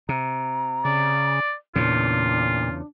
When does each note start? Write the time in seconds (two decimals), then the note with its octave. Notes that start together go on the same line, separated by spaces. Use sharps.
0.09 C3 A#5
0.85 C#3 D5
1.76 E2 A#2 C#3 D4 F4